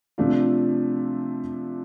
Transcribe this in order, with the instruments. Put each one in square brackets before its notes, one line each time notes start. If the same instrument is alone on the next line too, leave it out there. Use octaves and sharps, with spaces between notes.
[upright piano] C3 F3 A3 D4 F4